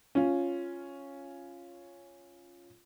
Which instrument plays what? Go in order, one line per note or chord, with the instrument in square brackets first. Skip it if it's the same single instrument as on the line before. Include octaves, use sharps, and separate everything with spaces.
[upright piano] C#4 F4